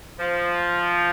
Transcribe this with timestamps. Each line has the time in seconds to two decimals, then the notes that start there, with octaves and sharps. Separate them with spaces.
0.20 F3